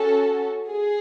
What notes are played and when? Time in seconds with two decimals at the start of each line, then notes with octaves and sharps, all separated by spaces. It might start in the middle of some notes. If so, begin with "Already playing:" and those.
Already playing: C#4 F#4 A4
0.69 G#4